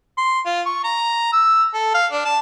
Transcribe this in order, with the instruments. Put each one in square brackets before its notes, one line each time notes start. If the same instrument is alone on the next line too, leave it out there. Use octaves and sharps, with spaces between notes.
[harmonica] C6
F4
C#6
A#5
E6
A4
F5
D4
A5